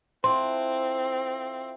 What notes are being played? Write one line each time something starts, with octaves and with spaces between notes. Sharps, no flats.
C4 E4 F4 A4 C5 C6